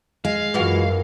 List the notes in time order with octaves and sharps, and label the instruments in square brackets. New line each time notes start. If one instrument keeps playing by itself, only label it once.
[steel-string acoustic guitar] G#3 [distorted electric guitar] F5
[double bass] F#2 [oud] E3 F4 F#4